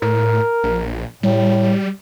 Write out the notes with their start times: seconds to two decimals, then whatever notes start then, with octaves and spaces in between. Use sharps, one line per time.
0.02 A2 A#4
0.64 A#1
1.23 A2 G3